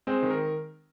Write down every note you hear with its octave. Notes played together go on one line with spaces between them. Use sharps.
G#3 C4 C5
D#3
A#4